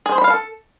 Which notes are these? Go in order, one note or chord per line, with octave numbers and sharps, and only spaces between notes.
G#4
C5
B5
F5
A4